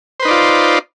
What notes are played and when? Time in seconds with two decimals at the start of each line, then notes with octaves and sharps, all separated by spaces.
0.20 C5
0.22 B4
0.25 D#4
0.28 D5
0.31 F4